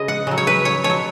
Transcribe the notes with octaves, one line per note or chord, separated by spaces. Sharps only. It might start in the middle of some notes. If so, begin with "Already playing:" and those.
Already playing: C#3 G#3 D#5
F#5
C#3 F#3
C#5
B4
C#5
B2 C#5
F#3